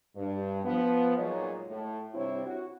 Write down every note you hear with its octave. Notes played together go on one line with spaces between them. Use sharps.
G2
F3 B3
A#2 F#3 G#3 D#4 C#5 D#5
A2
G2 C3 C4 E4 C#5
F#4